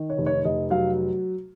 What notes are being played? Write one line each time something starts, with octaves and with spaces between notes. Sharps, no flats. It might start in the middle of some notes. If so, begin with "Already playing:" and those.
Already playing: D#3
C#5
F1
C#5
F1 D#5
F#3 F5